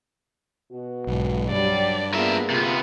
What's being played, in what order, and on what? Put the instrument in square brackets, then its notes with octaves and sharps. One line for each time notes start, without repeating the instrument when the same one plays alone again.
[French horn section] B2 F#4
[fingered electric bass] B1 G#2
[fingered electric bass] G2 [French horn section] F#3 G3 [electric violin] D5
[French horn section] A#3 G#4 [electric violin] B3 F4 [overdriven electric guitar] A#4 E5
[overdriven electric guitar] C3 B3 [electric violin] F4